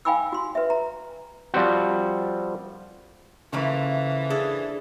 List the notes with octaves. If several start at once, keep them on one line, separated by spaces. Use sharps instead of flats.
F5 G5 G#5 B5 D6 E6
F#4 C6
B4 E5
A#5
F3 G3 C4 F#4
C#3 E3 F3 A3 A#3
D4 G#4 A4